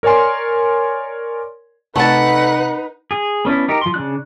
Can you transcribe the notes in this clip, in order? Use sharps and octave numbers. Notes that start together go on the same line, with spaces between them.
A#4 C#5 D5 G#5 C6
C3 A3 D#4 B4 D5 F#5 A5 B6
G#4
B3 C#4 D4 E4
D#4 G4 A#4
F3 C6
C#3 D4 F#6